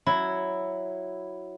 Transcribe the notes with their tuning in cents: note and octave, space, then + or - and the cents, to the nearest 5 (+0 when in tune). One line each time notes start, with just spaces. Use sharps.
F#3 +0 E4 +0